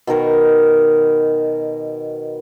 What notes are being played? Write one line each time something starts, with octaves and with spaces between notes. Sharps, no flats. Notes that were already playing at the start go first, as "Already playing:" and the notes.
B2 D#3 A#4 C#6